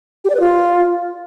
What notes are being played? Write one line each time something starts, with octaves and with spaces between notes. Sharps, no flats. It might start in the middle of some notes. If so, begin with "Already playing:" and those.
G4
D5
B4
F4